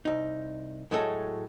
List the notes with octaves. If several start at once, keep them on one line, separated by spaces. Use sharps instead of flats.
C2 D#4
A2 F#3 G#3 A3 A4